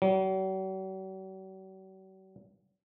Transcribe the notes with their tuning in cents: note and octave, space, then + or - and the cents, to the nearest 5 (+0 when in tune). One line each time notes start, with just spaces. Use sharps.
F#3 +45